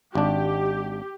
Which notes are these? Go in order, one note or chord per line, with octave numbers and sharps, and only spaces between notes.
G#1 D4 G4